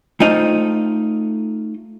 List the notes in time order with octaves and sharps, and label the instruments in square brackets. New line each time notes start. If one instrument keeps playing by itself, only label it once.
[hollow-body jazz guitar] A3 D#4 F4 C5 D#5